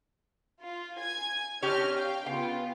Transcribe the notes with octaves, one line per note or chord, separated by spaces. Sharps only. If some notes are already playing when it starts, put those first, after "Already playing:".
F4
G#5 G#6
C4 D4 G4 C#5 D#5 F6
F5 G5
C#3 B3 F4 G5